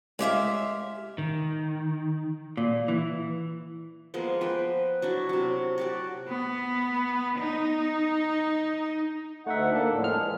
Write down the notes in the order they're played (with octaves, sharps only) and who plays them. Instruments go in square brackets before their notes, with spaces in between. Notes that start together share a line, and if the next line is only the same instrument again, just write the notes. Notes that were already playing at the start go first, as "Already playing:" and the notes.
[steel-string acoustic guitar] G#3 G4 E5 F5
[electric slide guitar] D#3
[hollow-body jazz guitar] A#2
E3
[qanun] F3 G#3 A#3 B3
F3 B4 G5
F#3 D4 E4
C3 F#3
F#4 G4 D5
[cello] B3
D#4
[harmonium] D2 F#5 [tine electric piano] A3 D#4 E5
[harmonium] A#3 [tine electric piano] D4 A4
[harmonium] F2 A2
[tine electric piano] G#3 G#4 F6
[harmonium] E3